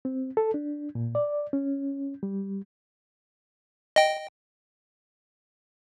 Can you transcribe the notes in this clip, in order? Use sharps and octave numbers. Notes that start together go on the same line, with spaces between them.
C4
A4
D4
A#2
D5
C#4
G3
D#5 G5